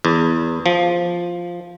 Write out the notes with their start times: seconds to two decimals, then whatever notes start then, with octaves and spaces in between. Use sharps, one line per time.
0.05 E2
0.66 F3